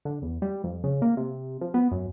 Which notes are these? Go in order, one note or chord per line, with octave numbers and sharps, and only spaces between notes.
D3
E2
G3
F2
C#3
A#3
C3
F3
B3
F#2